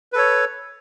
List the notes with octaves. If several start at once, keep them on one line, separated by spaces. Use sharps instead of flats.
A4 B4 C#5